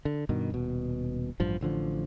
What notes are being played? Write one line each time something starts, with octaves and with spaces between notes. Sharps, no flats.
D3
G2 B2 D#3
D#1 B2
A1 G2 F3
A1 D3 F3